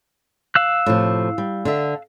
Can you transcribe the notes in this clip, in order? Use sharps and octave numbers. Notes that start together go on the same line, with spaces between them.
F5 E6 F#6
A2 C3 F3
G3
D3 D4 E5